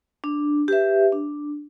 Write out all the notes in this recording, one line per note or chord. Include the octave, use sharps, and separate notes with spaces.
D4
G4 B4 E5
D4